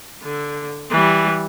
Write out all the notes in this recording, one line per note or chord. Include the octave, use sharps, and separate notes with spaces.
D3
E3 G3